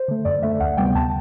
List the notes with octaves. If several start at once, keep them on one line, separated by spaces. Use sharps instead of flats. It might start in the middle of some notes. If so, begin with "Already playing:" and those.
Already playing: C5
D3 A3
F#2 D5
D3 A3 E5
D2 F#5
C3 G3 B3 G5
D2 A5